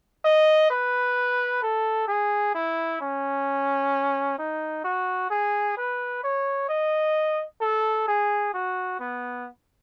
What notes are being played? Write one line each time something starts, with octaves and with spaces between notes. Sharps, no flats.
D#5
B4
A4
G#4
E4
C#4
D#4
F#4
G#4
B4
C#5
D#5
A4
G#4
F#4
B3